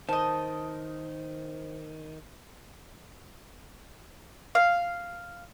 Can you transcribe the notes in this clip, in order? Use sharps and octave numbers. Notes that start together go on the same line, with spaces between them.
D#3 C5 D#5 A5
F5